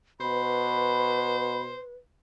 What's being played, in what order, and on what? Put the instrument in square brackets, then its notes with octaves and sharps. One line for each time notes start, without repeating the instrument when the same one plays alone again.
[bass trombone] B2 [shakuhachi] B4 [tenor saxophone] C5 [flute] B5